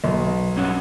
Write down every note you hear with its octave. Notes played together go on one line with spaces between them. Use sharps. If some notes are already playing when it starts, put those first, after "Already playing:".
B1
G2 C#4 F#5